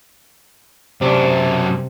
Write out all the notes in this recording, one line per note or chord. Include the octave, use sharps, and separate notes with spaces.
F#2 C3 D4